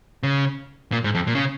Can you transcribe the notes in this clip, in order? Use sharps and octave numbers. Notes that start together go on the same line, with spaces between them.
C#3
A#2
G#2
F2
A#2
C#3